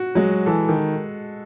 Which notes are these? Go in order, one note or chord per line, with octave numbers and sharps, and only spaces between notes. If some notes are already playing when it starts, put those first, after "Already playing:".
Already playing: F#4
F#3 G#3
E3 A4
D#3